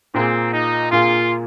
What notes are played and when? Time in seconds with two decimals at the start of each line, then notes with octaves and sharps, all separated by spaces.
0.14 A#2 A#3 C4 G#4
0.54 D#4
0.92 A#2 A#3 F4 G#4